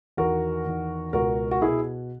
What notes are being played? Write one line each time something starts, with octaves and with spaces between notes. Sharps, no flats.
E2 D#3 F#4 A#4
E2 D#3
C#2 B2 F#4 A#4
F#4
B2 E4 G#4